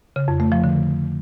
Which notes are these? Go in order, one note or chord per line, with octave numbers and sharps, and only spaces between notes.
C#3
F2
A3
F3
D3